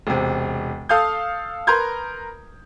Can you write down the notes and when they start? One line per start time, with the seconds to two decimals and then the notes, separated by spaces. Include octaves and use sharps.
0.07 E1 C3
0.89 A4 F5 D#6 G6
1.67 A#4 B4 A#5 C6 G6 G#6